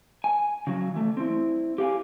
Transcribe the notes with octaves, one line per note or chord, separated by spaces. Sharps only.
G#5
C#3 F#3
E3 A3
C4 E4
G4 F5 F#5 G#5